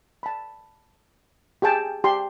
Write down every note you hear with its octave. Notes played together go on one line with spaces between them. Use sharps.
A5 B5
G4 G#4 G5 A5
G4 A5 C6